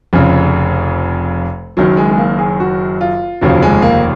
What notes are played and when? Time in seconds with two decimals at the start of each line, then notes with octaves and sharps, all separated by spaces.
0.13 F1 F2 C#3
1.77 F#1 F#2 D#3 F#3
1.97 G#3
2.11 G#3
2.18 A#3
2.38 G#4
2.60 F#4
3.01 F4
3.41 F1 D#2 C#3 F3 F#3
3.62 G#3
3.82 A#3